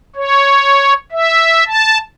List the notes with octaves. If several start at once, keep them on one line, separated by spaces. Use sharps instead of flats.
C#5
E5
A5